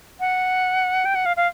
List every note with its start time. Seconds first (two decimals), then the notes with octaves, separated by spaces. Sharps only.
0.20 F#5
1.05 G5
1.15 F#5
1.26 F5
1.37 F5